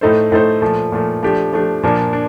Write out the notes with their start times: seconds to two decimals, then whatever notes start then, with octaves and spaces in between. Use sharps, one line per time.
0.01 A2 A3 D#4 A4 C5
0.32 A2 A3 D#4 A4 C5
0.62 A#2 F3 A3
0.92 A#2 F3 A3
1.23 F3 A3 D4 G4
1.53 F3 A3 D4 G4
1.83 A#2 F3 A#3 D4
2.13 D4